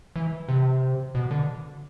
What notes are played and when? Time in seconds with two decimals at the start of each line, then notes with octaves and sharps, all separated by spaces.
0.16 E3
0.49 C3
1.15 B2
1.31 D3